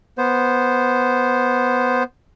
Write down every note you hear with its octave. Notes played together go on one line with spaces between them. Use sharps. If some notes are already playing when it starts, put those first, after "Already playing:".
B3 C5